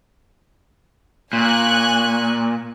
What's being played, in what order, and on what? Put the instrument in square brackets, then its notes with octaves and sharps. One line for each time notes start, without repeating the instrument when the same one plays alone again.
[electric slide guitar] A#2 [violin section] G#5 C#6 F#6